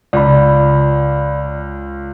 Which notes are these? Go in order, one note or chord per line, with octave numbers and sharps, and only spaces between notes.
C#2 D5 B5